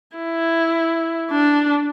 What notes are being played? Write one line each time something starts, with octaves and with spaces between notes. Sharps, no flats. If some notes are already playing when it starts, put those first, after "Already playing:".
E4
D4